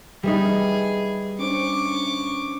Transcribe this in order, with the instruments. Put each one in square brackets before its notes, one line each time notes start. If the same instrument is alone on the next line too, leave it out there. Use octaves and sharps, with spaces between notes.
[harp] G3 B3 D#4 [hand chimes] G4 E5 B5 [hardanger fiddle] G#4
[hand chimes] C#4 D4 C5 [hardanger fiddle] C#6 D6